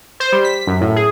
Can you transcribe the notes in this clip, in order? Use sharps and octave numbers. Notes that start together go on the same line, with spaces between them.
C5
G3
B6
F#2
A2
G#4